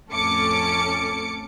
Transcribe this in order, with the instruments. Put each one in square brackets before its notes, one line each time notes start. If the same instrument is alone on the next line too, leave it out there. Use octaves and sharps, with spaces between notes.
[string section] F2 A2 C#4 A4 D6 C#7